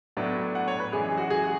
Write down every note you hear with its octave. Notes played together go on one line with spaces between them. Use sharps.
A2 F#3 B3 D4
F#5
C#5
B4
F#2 E3 G#3 G#4
F#4
G#4
F#4